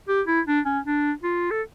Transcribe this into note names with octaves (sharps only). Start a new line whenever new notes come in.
G4
E4
D4
C#4
D4
F4
A4